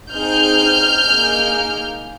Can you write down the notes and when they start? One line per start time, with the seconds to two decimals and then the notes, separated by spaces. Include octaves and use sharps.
0.12 C4 D#4 G#4 F6 G6
1.06 A#3 D#4 G#4